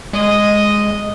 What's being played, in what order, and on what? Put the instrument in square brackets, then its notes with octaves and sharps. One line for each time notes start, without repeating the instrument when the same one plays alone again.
[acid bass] G#3 [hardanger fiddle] D#5